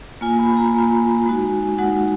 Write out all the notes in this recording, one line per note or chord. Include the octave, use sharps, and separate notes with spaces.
A#3 F4 G#5
B5
A#5
A#3 F4 G#5
G#3 D#4 F#4
G#3 D#4 F#4 F#5